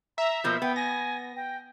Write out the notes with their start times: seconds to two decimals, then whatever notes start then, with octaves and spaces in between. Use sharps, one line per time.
0.18 E5 A#5
0.44 B2 F3 A#3 G6
0.62 B3 G5
0.76 G#5 A#6
1.36 G5